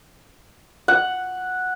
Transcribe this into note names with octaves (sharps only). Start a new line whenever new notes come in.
F#5